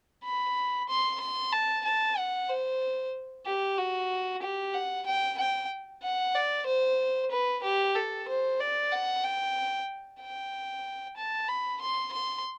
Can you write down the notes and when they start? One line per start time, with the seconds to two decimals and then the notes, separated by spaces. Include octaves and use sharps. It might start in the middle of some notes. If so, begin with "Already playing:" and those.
0.24 B5
0.89 C6
1.20 C6
1.52 A5
1.85 A5
2.17 F#5
2.49 C5
3.46 G4
3.78 F#4
4.42 G4
4.74 F#5
5.06 G5
5.38 G5
6.03 F#5
6.35 D5
6.66 C5
7.31 B4
7.64 G4
7.95 A4
8.28 C5
8.60 D5
8.92 F#5
9.24 G5
10.21 G5
11.17 A5
11.48 B5
11.81 C6
12.13 C6